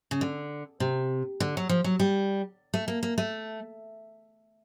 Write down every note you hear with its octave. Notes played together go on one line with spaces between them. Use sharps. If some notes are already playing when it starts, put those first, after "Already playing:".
C#3
D3
C3
D3
F#3
F3
F#3
G3
A3
A#3
A#3
A3